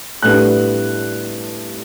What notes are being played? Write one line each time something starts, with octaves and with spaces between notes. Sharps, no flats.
A2 G3 B3 D4 F#6